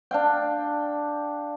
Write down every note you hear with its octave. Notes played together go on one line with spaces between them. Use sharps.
D4 F5 G5